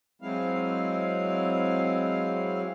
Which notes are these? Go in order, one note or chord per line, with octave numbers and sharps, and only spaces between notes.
F#3 G#3 C4 E4 F5